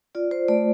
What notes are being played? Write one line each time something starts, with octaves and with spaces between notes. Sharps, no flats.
F4 D5
C5
A3 D5